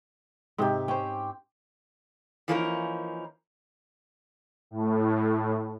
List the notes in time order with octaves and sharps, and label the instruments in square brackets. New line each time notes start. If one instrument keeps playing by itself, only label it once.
[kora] G#2 C3 D#4 [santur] C4 G4
[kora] C#4 C5 [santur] G5
[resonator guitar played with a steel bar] E3 F3 A#3 C#4 D#4 A#4
[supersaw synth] A2